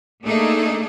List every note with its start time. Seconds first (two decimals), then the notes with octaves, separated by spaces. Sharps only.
0.23 A3 A#3 D4 D#4 G#4 A4